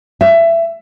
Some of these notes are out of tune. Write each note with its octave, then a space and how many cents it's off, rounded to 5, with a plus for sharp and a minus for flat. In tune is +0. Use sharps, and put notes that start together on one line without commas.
E5 +20